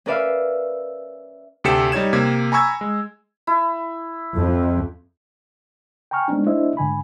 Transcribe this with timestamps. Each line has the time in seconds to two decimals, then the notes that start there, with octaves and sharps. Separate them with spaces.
0.06 C#4 A#4 B4 D5 E5 F5
1.64 D2 C3 G4 A4 C#7 E7
1.92 G3 D#4 C#5 G#6 E7
2.13 C3 A#3 G#6
2.52 G#5 A#5 B5 C#6 E6 G#6
2.81 G#3
3.47 E4
4.37 F2
6.11 G5 G#5 A#5 C#6 F6
6.28 G#3 B3 C4 D4 D#4
6.46 A3 D4 E4 C5 D#5 E5
6.77 G#2 D3 G#5 B5